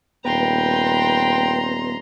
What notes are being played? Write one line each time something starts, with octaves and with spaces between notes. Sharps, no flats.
D#1 B3 B4 G5 A#5 C6